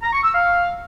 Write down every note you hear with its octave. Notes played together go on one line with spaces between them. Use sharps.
A#5
C#6
E6
F5